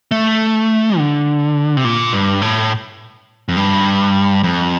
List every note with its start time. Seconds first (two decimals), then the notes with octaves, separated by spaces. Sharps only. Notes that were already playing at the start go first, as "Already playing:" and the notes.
0.11 A3
0.98 D3
1.77 C3
1.85 A#2
2.13 G2
2.42 A2
3.49 F2
3.57 G2
4.43 F2